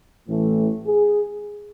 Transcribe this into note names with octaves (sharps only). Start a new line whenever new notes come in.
A1 A2 E3 A3
G#4